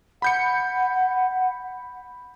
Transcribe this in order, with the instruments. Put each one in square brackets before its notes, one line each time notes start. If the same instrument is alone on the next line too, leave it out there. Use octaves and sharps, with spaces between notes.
[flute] F#5 [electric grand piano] B5 G6 C#7